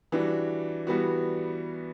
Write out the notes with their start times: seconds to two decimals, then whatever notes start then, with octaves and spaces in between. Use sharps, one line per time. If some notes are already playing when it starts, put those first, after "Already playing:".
0.12 E3 G3 D4 F#4
0.87 E3 G3 B3 F#4